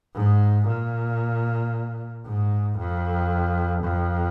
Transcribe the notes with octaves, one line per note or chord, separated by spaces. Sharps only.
G#2
A#2
G#2
F2
F2